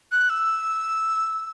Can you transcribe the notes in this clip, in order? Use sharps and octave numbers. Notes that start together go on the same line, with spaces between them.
F#6
E6